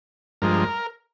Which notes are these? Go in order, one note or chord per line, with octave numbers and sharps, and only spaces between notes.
G2 F3 G#3 A#4